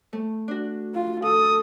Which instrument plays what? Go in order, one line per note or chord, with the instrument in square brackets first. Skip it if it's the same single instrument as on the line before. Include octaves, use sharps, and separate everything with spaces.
[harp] A3
D4 F#4
[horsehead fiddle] F4
[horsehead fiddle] A4 [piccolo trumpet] D#6